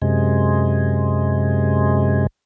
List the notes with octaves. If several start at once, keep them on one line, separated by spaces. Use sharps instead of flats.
F#2 C3 G#3